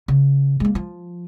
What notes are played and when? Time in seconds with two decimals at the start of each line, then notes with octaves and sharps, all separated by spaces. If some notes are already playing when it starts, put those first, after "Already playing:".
0.08 C#3
0.60 G#3 A#3
0.75 F3